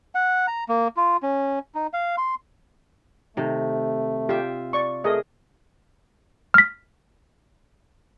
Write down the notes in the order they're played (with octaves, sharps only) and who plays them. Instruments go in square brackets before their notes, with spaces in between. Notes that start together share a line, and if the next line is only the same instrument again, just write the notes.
[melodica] F#5
A#5
A#3
F4
C#4
D#4
F5
C6
[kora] C3 D#3 [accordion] A3
[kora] F4 E5 [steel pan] G4
[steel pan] D5 C#6
[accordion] A3 [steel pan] G#4 A#4 D#5
[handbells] F6 B6